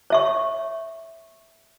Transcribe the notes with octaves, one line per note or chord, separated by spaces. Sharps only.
C#5 E5 C#6